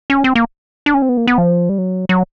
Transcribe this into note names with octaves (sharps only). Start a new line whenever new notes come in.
C#4
C4
A#3
D4
C#4
C4
B3
A#3
B3
F3
G3
F#3
F#3